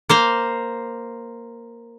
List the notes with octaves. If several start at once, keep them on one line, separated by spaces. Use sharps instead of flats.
A#3 C5 F5